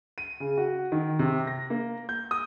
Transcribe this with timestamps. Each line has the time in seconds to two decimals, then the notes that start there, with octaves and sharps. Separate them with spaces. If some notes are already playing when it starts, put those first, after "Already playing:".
0.18 D#7
0.40 C#3
0.57 F#4
0.92 D#3
1.19 C3
1.47 A#6
1.70 A#3
2.09 G6
2.31 D#6